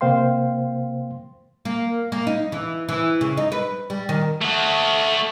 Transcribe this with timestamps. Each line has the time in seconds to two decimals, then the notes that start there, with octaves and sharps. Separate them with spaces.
0.01 C3 A#3 C5 F5 G5 C6
1.65 A#3
2.12 A#3
2.27 D#4
2.52 E3
2.89 E3
3.21 C#3
3.37 D#4
3.52 B4
3.90 G3
4.09 D#3
4.42 A3 F#4